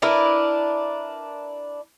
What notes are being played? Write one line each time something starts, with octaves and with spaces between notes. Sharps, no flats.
D4 E4 A#4 B4